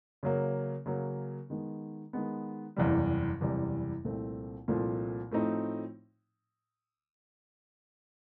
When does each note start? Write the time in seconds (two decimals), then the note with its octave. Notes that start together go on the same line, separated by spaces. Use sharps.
0.23 C#3 F#3 A#3
0.86 C#3 F#3 A#3
1.50 D#3 G#3 B3
2.13 D#3 G#3 B3
2.76 F#1 E2 C3 E3 G3
3.41 F#1 E2 C3 E3 G3
4.05 C2 A#2 F3 A3 C4
4.68 C2 A#2 F3 A3 C4
5.31 A2 F3 A3 C4 D#4